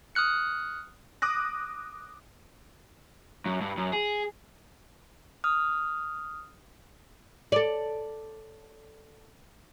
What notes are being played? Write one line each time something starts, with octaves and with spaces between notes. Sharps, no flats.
D#6 F6 F#6 C#7
D6 D#6 F#6 A#6
F#2
G2
F#2
G#4
D#6 F6
A4 D5